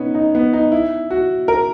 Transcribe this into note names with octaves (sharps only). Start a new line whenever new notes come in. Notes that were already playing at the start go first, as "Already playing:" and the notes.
Already playing: B3 C#4 D#4
D#4
B3
D#4
E4
F#4
A#4